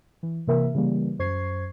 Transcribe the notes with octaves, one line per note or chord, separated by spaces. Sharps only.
E3
C3 E3 A#3 A#4 E5
C#3 E3 G3 A#3
F#2 C5 C#6 G#6 C7